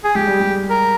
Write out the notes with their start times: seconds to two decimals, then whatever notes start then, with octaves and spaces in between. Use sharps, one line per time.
0.04 G#4
0.15 G#3 G4
0.27 G3
0.40 G#3
0.70 A#4